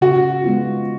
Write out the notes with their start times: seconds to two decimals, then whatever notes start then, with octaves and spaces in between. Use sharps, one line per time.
0.01 C#3 F#4
0.44 G#3 B3 F4